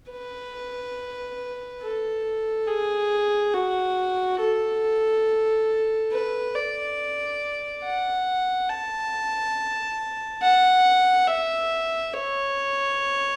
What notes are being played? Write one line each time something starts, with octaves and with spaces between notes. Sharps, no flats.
B4
A4
G#4
F#4
A4
B4
D5
F#5
A5
F#5
E5
C#5